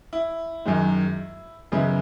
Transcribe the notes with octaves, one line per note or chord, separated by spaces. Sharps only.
E4
F#2 D#3 G#3
F#2 C#3 G#3 B3 E4